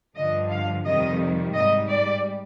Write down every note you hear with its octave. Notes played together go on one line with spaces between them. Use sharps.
G2 D3 F3 D#5
F5
F2 C3 D#3 G3 D#5
G#2 G3 D#5
D5